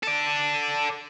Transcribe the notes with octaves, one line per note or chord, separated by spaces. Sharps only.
A4 D5